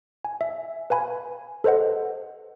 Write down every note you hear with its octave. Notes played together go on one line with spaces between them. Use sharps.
G#5
E5
B4 F5 G#5 B5
A4 B4 C5 D#5 F#5